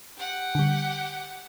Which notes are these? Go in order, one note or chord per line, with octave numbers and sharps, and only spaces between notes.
G4 F#5
D3 G3